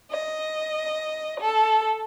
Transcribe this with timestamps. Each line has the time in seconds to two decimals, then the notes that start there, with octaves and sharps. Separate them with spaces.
0.11 D#5
1.41 A4